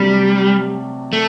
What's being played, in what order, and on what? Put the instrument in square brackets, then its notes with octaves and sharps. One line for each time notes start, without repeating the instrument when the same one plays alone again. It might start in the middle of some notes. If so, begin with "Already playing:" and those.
Already playing: [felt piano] C3 F#3 A3 D4 [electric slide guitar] G3
[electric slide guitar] A3